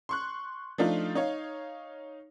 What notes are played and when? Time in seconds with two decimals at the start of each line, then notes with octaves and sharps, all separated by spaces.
0.09 C6 C#6 F#6
0.78 F3 A3 D4 D#4 F4
1.15 D#4 C#5 F5